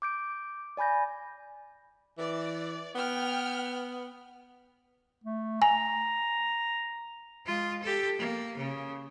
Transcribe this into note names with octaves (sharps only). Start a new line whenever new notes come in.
D6 G6 D7
D5 G#5 B5 G6 A#6
E3 D5
B3 G5 F6
A3
G#5 A#5
G#3 F4
G4 A4
A#3
C#3